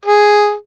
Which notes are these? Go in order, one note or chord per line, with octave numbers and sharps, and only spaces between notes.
G#4